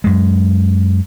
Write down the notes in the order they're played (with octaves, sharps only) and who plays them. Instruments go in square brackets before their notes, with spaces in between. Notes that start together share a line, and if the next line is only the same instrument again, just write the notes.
[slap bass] F#2 G#3